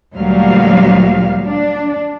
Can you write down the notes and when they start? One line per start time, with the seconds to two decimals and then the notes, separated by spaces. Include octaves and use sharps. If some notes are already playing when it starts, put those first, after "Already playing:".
0.14 D2 A#2 F#3 G3 F5
1.44 D4